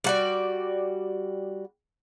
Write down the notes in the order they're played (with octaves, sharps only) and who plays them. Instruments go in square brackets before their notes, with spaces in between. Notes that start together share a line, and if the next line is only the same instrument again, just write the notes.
[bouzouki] G3 F#4 D5